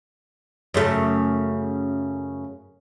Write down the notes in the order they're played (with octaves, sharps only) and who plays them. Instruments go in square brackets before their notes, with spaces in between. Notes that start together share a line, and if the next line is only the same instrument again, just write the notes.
[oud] F#2 C#3 A3